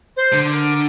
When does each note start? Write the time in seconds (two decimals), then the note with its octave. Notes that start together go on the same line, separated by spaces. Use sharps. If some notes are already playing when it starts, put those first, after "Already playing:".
0.16 C5
0.33 D3
0.50 A#4